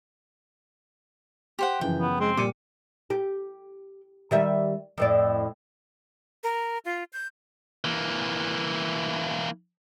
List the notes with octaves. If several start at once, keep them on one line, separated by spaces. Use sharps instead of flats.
G4 C5 F#5
F#2 C#3 E3 F3 G5
B3
G#3 C4
A#2 G3 D6 C#7 D#7
G4
D#3 G3 E5
F2 A2 D5
A#4
F4
G6
E3 A#3